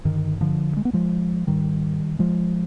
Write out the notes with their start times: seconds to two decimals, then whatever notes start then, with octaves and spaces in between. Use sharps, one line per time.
0.05 G2 D3 D#3
0.41 D3 F3
0.77 G#3
0.85 B3
0.93 F3 G#3
1.47 G#2 D#3 G3
2.19 F3 G#3